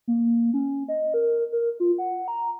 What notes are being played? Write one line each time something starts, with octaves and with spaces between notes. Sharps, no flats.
A#3
C#4
D#5
A#4
A#4
F4
F#5
A#5